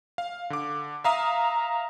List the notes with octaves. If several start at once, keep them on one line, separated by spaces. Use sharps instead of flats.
F5
D3 D6
E5 F5 A#5 D#6